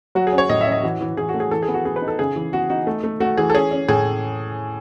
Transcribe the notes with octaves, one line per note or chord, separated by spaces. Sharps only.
F#3 F#4
G#4
C#4
C#5
A2 D#5
E5
C#4
D#5
E3 F#4
E3
E3 G#4
F#4
A3
G#4
E3 A4
G#4
B3
F#4
B3 G#4
B4
D#4
A4
C#3 G#4
E3
B3 F#4
D#4 F#4
A3
A3
A3 F#4
E3 G#4
A4
C#4 G#4
C#4
A2 G#4